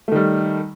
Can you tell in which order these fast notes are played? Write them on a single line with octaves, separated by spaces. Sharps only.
A3 D#3 G3